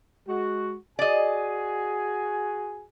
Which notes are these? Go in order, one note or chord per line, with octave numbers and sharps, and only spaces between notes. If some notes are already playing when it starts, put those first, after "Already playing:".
G#3 F#4
F#4 G#4 D5 D#5 G#5